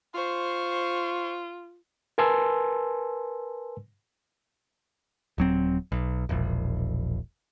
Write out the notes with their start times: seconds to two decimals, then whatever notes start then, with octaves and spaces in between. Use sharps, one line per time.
0.14 F4 C5 C#6
2.18 A#4 B4 G#5 A5 C6 E6
5.38 D#1 F#3 C4
5.92 B1
6.29 E1 A#1